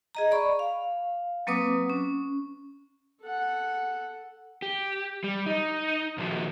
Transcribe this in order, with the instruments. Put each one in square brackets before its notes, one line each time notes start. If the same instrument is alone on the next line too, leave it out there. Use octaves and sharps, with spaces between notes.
[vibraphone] G#4 D#5 A#5
D5 B5 C#6
F5
F#3 A#3 C4 B4 D6 D#6
C#4
[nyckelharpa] A4 F#5
[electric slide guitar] G4
G3
D#4
A#2 D#3 F3 F#4